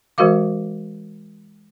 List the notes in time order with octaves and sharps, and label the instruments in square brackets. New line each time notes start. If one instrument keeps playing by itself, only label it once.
[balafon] E3 G#3 F#4 A#4 F5 D6